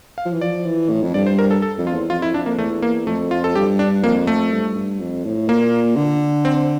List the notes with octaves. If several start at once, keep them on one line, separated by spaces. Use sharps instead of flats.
F5
F3
E3
F3 D5
E3
A2
F2
G2 D5
C5
A#4
A4
A4
F2
F4
E2
F2 F4
E4
F2 D4
A#3
E2 A3
A#3
F2 A3
F4
A4
G2 G4
D4
F2 A#3
A3
G2
G2
F2
A2
A#2 A#3
D3
C4